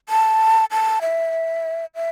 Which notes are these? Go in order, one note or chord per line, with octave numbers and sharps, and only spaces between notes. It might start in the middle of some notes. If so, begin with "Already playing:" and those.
A5
A5
E5
E5